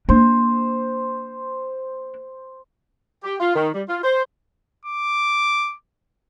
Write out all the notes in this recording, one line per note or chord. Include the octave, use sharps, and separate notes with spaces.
A#3 D4 C5
G4
F4
D#3
G3
F4
C5
D6